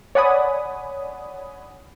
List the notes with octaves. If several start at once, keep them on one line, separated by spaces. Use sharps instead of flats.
C#5 D5 F#5 G#5 B5 D#6